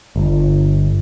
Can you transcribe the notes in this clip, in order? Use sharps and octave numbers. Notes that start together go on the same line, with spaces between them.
G1